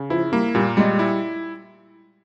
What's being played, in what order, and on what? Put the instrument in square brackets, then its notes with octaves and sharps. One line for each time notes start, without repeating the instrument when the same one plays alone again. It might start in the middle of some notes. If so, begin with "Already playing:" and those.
Already playing: [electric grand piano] C#3
[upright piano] F3 [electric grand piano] E4
[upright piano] G3 [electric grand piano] A#3
[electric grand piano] A#2 [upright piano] G3
[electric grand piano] G3 [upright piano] G#3
[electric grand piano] E4